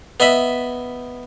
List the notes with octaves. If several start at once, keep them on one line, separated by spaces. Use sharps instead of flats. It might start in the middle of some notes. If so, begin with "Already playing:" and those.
B3 D#5 E5 B5